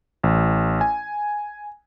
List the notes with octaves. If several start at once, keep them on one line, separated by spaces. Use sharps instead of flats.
A1
G#5